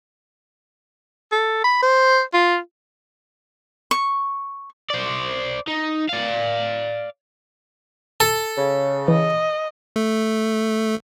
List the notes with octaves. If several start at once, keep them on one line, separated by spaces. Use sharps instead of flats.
A4
B5
C5
F4
C#6
C5 D5
D#4
D5 F5
A4 A5
C#3
E3 D#5
A3